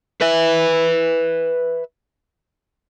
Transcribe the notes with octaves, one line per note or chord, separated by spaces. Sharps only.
B4 E5